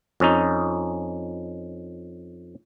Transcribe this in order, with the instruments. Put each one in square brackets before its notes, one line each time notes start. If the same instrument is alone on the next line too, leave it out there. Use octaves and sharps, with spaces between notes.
[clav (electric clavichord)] F2 C#4 D#4